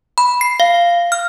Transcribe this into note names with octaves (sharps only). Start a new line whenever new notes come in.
B5
C7
F5
F6